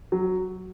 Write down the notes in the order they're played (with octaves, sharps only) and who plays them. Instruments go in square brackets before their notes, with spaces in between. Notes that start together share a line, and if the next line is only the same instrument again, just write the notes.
[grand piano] F#3